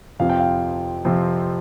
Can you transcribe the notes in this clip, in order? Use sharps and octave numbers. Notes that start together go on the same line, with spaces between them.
F2 C3 F3 C4 F5
G5
F5
F2 C3 F3 C4